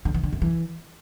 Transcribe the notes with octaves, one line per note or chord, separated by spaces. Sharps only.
D3
E3
D3
F#2
E3